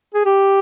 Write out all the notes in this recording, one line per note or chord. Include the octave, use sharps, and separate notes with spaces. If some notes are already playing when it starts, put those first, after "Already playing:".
G#4
G4